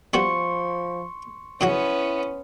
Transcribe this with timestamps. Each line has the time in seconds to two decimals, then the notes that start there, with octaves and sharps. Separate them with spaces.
0.14 F3 G3 B3 F#4 C6 C#6 C#7
1.61 C#3 F#3 B3 C#4 E4 F#4